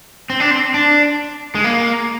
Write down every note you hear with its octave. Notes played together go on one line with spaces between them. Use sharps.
C4
D4
C4
D4
G#3
A#3